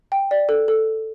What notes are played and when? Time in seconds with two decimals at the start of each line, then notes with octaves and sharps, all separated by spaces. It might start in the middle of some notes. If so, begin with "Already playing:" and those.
0.12 G5
0.31 D5
0.49 A4
0.68 A4